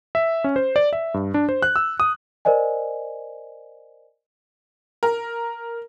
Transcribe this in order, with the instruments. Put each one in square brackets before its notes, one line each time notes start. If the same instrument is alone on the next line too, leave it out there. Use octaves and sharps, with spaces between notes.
[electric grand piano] E5
C#4
C5
D5
E5
G2
D4
C5
F#6
E6
D#6
[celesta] A#4 C5 D5 D#5 G#5
[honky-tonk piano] A#4